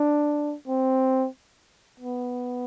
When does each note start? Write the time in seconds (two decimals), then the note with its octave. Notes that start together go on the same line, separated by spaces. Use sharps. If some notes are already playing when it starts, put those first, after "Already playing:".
Already playing: D4
0.68 C4
2.00 B3